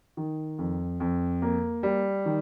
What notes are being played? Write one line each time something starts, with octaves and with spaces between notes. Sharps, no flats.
D#3
F2
F2
A#3
G3
D#3